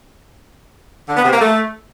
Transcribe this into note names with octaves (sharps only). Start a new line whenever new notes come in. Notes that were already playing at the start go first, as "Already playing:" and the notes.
D3
B3
C3
A#3
A3